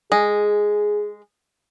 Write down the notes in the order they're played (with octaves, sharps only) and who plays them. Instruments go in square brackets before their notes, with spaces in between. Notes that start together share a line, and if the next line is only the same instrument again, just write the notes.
[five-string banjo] G#3 [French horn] G#4